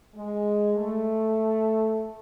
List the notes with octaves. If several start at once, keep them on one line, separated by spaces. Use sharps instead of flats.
G#3
A3